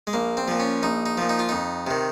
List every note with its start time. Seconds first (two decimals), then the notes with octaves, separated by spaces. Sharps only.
0.07 G#3
0.13 A#1 A#3
0.37 C4
0.48 A#2 F3
0.60 C#4
0.83 A#1 D#4
1.06 D#4
1.18 A#2 F3
1.29 D#4
1.39 F4
1.49 F2 D#4
1.87 C3 D#3